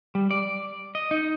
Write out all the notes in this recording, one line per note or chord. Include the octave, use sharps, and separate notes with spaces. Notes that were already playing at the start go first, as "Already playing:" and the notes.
G3
D5
D#5
D#4